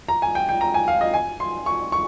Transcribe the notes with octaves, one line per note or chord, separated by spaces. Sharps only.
A#5
G#5
G5
G5
A#5
G#5
F5
D#5
G#5
C6
C#6
C#6